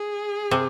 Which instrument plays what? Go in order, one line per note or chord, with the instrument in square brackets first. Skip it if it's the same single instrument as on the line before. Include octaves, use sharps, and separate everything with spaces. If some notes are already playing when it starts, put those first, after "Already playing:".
Already playing: [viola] G#4
[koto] C3